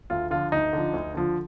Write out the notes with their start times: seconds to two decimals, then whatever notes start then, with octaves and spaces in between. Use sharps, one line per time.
0.10 D2 F4
0.31 D3 F3 F4
0.52 D2 D#4
0.73 D3 F3
0.93 D2
1.14 D3 F3